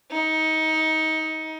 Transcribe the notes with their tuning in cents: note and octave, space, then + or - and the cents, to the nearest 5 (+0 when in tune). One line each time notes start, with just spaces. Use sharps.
D#4 +20